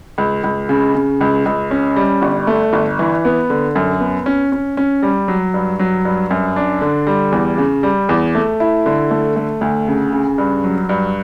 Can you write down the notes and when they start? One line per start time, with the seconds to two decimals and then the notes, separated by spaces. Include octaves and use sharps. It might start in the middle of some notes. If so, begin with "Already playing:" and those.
0.18 C#2
0.44 C#2
0.69 C#3
0.95 C#3
1.21 C#2
1.45 C#2
1.71 C#4
1.96 G3
2.22 G1
2.47 A3
2.73 G1
2.99 E3
3.25 B3
3.50 D3
3.75 F#2
4.00 B3
4.26 C#4
4.52 C#4
4.77 C#4
5.03 G3
5.28 F#3
5.54 G2
5.79 F#3
6.05 G2
6.31 F#2
6.56 D4
6.81 D3
7.07 G3
7.32 E2
7.58 C#3
7.83 G3
8.09 E2
8.35 A3
8.60 E4
8.86 D3
9.11 A3
9.36 A3
9.61 D2
9.88 C#3
10.13 C#3
10.38 G2
10.64 F#3
10.89 G2